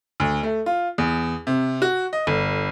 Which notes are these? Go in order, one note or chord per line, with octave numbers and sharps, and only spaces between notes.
D2
A3
F4
E2
C3
F#4
D#5
G1